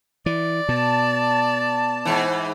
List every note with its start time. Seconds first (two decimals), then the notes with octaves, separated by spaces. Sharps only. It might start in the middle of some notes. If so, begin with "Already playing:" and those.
0.26 E3 D5
0.69 B2 A5
2.05 G#2 E3